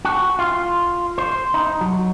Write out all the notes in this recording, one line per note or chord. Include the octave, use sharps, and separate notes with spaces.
F#4
F4
C5
D#4
F#3